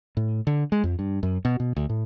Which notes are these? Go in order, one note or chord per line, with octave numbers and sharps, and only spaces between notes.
A2
D3
G#3
F2
G2
F#2
B2
B2
D2
A2